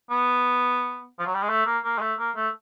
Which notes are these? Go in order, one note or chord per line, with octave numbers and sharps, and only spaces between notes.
B3
F3
F#3
G3
G#3
A3
A#3
A#3
G#3
A3
A#3
A3